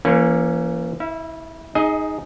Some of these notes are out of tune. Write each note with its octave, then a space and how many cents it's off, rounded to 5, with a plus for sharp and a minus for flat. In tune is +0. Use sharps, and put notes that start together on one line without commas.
E3 +35 A#3 +0 C#4 +0
E4 -25 E5 +35
D#4 +0 G#4 +0 D#5 +30